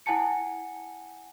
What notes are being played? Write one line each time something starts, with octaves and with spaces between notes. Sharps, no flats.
E4 F#5 G#5 A5 C#7